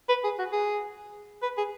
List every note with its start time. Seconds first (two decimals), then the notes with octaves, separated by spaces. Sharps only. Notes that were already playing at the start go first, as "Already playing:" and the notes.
0.09 B4
0.24 G#4
0.39 F#4
0.53 G#4
1.42 B4
1.57 G#4